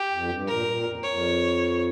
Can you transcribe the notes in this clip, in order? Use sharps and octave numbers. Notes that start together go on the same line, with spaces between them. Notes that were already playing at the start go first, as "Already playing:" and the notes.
Already playing: G4
F2
G2
A#2 A#4
G#2
A#2
F2
F2 C#5